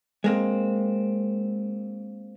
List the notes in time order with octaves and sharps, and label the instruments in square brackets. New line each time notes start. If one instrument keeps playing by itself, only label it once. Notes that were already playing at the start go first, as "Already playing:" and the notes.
[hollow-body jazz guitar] G#3 A#3 C4